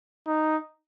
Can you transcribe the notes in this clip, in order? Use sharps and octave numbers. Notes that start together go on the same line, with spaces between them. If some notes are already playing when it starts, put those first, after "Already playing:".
D#4